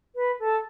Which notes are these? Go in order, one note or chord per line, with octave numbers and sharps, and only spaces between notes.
B4
A4